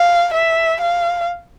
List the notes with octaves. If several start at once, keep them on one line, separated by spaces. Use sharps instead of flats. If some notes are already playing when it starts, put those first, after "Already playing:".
Already playing: F5
E5
F5